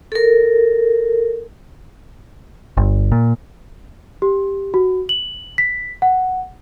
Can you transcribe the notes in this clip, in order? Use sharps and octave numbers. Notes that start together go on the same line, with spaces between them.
A4 A#4
G1
A#2
G4
F#4
F#7
B6
F#5